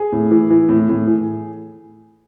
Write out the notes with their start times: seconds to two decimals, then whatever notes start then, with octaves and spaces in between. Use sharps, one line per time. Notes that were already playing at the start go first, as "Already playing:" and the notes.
Already playing: G#4
0.12 A2
0.31 E3
0.50 E3
0.69 A2
0.89 A2
1.07 E3